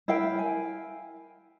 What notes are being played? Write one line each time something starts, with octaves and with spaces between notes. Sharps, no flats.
E4 A#4 F5 G5
G#5